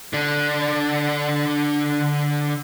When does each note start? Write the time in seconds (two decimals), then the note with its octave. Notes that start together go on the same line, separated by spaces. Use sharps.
0.13 D3 D4